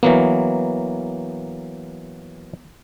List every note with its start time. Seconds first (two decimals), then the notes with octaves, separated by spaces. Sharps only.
0.03 E3 F#3 A#3 B3